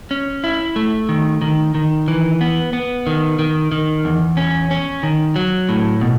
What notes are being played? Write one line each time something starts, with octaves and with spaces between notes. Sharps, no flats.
C#4
E4
A3
D#3
D#3
D#3
E3
B3
B3
D#3
D#3
D#3
E2
C#4
C#4
D#3
F#3
A2
B2